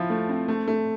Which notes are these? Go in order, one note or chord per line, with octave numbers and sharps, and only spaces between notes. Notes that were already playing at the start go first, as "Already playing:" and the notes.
Already playing: F3 E4 F4
A3
C4
A3
A3